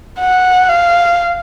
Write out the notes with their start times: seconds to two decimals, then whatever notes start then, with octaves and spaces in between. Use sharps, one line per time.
0.20 F#5
0.69 F5